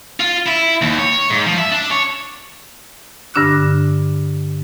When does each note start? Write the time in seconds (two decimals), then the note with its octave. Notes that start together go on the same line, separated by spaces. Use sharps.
0.20 F4
0.48 E4
0.82 D#2
0.99 C#5
1.30 G#2
1.47 F3
1.58 E5
1.72 D4
1.91 C#5
3.34 G2 D3 D4 E6 F#6